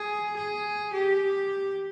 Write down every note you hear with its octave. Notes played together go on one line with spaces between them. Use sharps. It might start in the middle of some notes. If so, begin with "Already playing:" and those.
Already playing: G#4
G#4
G4